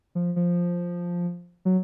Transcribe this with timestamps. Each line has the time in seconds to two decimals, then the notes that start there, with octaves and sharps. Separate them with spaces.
0.15 F3
0.36 F3
1.65 F#3